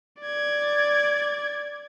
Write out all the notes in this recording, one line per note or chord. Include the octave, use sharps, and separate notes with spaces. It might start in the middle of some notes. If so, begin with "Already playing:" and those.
D5 G#6